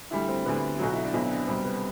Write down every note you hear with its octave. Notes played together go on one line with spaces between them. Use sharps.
D2 D3 G3 E4
C4
D2 D3 G3 B3
B1 B2 F#3 F#4
E4
D4
B1 B2 F#3 C4
D4
C2 B2 G3 C4
B3